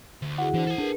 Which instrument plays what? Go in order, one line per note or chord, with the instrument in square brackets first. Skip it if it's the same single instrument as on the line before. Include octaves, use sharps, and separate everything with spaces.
[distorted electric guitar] D2
[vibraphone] E4 F#4 G#4 [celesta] F#5
[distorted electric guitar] D3 D4 [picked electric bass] E3 [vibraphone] E4 C5
[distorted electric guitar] A4 G#5
[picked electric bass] D4 [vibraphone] G#4 A#4 B4